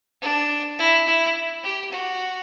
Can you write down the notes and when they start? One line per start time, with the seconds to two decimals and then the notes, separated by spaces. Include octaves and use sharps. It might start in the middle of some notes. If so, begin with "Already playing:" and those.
0.21 D4
0.79 E4
1.07 E4
1.63 G4
1.91 F#4